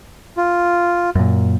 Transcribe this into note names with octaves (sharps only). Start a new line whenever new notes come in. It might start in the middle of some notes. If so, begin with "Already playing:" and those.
F4
F#2 A#2